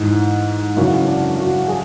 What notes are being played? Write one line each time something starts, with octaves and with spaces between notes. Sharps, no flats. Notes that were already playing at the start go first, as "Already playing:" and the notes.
Already playing: G#2 E3
F#2 C#3 E3 F#4
D4
F#4
G#4